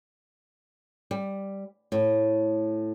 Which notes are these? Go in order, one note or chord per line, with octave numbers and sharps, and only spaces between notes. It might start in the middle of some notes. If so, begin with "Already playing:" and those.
G3
A2